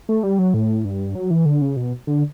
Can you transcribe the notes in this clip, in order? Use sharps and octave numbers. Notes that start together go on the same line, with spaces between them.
A3
G3
F#3
A2
G2
F#3
E3
D3
C#3
B2
D3